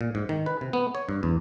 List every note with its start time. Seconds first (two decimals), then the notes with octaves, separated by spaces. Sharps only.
0.01 A#2
0.15 G#2
0.29 D#3
0.46 B4
0.61 C3
0.73 B3
0.95 C#5
1.09 G2
1.23 E2